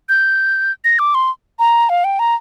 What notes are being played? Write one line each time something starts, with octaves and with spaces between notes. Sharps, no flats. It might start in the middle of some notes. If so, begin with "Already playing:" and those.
G6
A#6
D6
C6
A#5
F5
G5
A#5